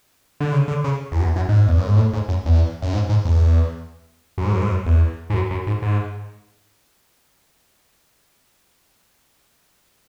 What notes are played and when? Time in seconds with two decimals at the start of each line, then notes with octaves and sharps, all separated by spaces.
0.40 D3
0.52 C#3
0.68 D3
0.84 C#3
1.12 E2
1.20 F#2
1.24 E2
1.36 F#2
1.49 G#2
1.68 E2
1.78 F#2
1.87 G#2
1.96 A2
2.13 G#2
2.28 F#2
2.45 E2
2.82 F#2
2.93 G#2
3.09 G#2
3.25 E2
4.38 F#2
4.45 G#2
4.53 F#2
4.61 G#2
4.69 F#2
4.86 E2
5.30 G#2
5.34 F#2
5.51 F#2
5.67 G#2
5.82 G#2